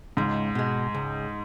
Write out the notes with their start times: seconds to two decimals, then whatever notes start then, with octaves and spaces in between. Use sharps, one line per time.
0.17 C#2 G#2
0.55 B2 G#3
0.94 C#2